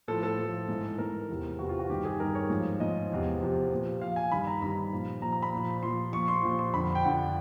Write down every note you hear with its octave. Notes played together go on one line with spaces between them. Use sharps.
A2 F3 A4
A4
A2 F3
G#2 E3
G#2 E3 A#4
E2 C3 E3
E2 C3 E3 F#4
F4
F#4
G2 D#3 G4
G#4
G2 D#3 A#4
C#5
G#2 F3
G#2 F3 D#5
E2 C3 F3
E2 C3 F3
A#2 F3
A#2 F3 F5
G#5
G2 D#3 B5
A#5
G2 D#3 B5
A#2 F3
A#2 F3 A#5
A#5
B5
A#2 F3
A#2 F3 C6
A#2 F3 C#6
C6
A#2 F3
C6
F2 D3 F3 B5
G5
F2 D3 F3 F#5